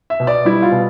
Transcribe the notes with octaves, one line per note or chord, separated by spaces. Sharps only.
E5
B2
D5
G3 E4
F4
B2